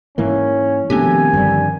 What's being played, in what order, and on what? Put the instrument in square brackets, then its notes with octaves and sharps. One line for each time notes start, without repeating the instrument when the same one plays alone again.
[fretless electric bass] G#2 E3 A#3 [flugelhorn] C#4
[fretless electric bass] B2 A3 [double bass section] D#3 F3 [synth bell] C4 D4 G4 [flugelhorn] G#5
[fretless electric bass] G2 D3 G3